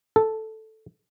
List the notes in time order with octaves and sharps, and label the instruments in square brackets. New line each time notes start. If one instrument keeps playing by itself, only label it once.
[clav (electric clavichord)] A4